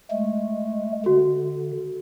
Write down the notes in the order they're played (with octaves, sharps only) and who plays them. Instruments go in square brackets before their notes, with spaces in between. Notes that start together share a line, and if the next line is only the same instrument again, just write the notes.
[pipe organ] G#3 A3
[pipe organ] D3 [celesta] F#4